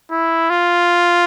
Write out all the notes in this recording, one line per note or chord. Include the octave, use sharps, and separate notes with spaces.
E4
F4